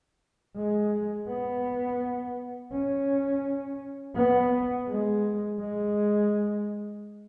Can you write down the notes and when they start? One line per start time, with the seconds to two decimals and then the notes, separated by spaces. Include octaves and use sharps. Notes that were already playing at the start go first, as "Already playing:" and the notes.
0.56 G#3
1.28 B3
2.72 C#4
4.16 B3
4.89 G#3
5.60 G#3